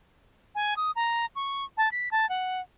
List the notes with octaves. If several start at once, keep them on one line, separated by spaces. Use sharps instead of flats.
G#5
D#6
A#5
C#6
A5
B6
A5
F#5